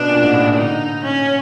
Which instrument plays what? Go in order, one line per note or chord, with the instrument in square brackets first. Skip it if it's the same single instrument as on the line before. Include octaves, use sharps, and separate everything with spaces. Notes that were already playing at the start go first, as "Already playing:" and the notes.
Already playing: [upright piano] B2 [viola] D4
[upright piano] A#2
G#2
A2
A#2
[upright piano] D3 [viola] D#4
[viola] C#4